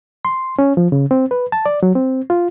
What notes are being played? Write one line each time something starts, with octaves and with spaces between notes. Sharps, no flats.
C6
C#4
F3
C#3
C4
B4
A5
D5
F#3
C4
F4